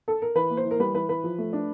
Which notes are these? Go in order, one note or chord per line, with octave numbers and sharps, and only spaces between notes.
A4
A#4
E3 B4
A#3
C5
E3
A#4
G3 B4
E3 B4
E3 B4
F3
A3
D4